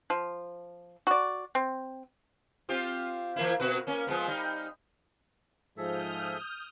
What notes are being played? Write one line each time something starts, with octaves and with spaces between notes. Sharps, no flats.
F3
F#4 D5
C4
C4 F4 G4
E3 A#3 E4
B2 F#4 B4
A#3 C#4
F3 G#3 B3
G3 D#4
G#2 F3 G#4 A4 E5 D#6 F6 G6